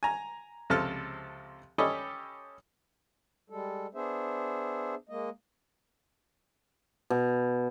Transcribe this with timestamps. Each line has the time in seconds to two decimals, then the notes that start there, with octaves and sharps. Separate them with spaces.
0.03 G#5 A#5
0.70 C#2 C3 F3 A4 A5 F6
1.78 C#4 G4 A4 D#5 G#5 B5
3.50 G3 G#3 A4
3.94 B3 D4 G#4 C5 E5
5.09 G#3 A#3 D#5
7.10 B2